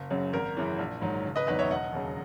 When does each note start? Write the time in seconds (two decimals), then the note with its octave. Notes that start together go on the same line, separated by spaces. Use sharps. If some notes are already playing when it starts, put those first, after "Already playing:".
Already playing: F#1
0.11 F#2 C#3 F#3
0.33 G#1 A#4
0.57 F#2 C#3 E3
0.79 A#1
1.02 G#2 D#3 F#3
1.25 F#1
1.36 B4 D#5
1.47 E2 D#3 F#3 B4 D#5
1.59 C#5 E5
1.70 E1 D#5 F#5
1.93 D#2 C#3 F#3